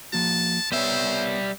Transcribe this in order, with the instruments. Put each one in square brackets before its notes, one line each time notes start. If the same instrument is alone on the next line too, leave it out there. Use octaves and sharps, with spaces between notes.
[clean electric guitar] F3 A#3 F#4 [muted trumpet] A5
[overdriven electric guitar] G3 E5 [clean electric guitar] B3 C#5 [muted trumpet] C5